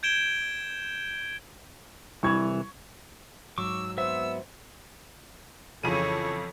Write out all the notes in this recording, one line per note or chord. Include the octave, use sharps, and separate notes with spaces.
G6 G#6 D7 E7 G7
C2 E3 G3 E4 C#6 G#6
G#2 F#3 C#6 D6 E6
B3 C5 E5 E6
F2 C#3 E3 A4 C#5 D#7